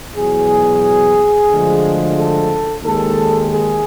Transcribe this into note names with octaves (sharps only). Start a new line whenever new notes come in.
E2 B2 F#3 G#4
D2 D3 F3 G#3
A4
D#2 D#3 G#3 A4
G#4